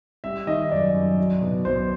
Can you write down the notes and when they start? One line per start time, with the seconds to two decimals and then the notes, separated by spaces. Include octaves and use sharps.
0.24 G3 E5
0.47 D#3 D#5
0.71 F#2 D5
0.94 F#2
1.18 F#3
1.42 B2
1.65 B1 C5